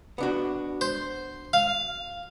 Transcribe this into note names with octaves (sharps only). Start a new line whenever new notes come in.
B3 D4 F#4
C5
F5